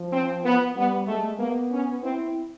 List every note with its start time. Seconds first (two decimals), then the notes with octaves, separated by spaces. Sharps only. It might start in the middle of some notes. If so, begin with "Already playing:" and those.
Already playing: F3
0.12 C4
0.44 B3
0.75 G3 B3
1.07 G#3 A3
1.38 A#3 B3
1.71 C#4
2.03 C4 E4